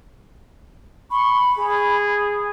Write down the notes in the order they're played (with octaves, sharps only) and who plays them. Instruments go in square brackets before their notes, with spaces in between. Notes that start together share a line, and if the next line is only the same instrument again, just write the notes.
[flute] B5 [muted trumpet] C#6
[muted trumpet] G#4